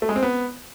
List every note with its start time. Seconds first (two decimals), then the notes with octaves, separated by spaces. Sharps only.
0.02 A3
0.09 G#3
0.16 C4
0.23 B3